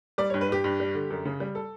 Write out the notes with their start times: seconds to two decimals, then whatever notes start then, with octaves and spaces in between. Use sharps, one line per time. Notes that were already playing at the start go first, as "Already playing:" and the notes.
0.18 G3 D5
0.30 C#5
0.34 G2
0.41 B4
0.49 G2 G4
0.64 G2
0.80 G3
0.95 D3
1.10 F#2
1.25 C#3
1.40 G3
1.55 A4